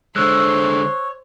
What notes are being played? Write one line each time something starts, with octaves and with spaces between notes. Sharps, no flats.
D3 G#3 C5 C#5 E6 F#6